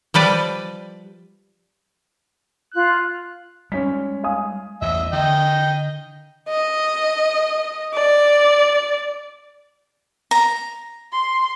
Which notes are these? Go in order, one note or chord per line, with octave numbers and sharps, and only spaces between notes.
F3 G3 B4 D5
F4 F#6
G3 G#3 C#4 B6
F5 G#5 D#6
A1 E2 D#5 E5
D3 D#5 G5
D#5
D5
A#5
C6